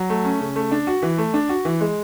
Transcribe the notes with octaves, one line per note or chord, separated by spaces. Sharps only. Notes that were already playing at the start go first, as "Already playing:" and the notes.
Already playing: F#3
A3
C#4
C#3
A3
D4
F#4
E3
A3
D4
F#4
E3
G#3